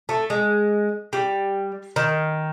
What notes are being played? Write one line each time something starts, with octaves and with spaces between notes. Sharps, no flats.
A3
G#3
G3
D#3